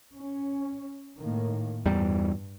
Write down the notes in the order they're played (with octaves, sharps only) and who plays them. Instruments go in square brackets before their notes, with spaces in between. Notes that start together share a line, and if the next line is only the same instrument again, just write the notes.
[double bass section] C#4
A2 D#3 A#3
[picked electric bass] E2 G3 [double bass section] G2